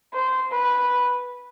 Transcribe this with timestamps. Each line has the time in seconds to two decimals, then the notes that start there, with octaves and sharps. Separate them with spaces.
0.13 C5
0.51 B4